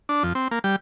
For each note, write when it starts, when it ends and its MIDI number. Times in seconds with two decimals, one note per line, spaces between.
0.09 0.23 62
0.23 0.33 41
0.35 0.48 60
0.51 0.59 58
0.64 0.76 55